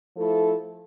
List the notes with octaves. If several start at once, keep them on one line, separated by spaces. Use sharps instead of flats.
F3 A3 E4 A4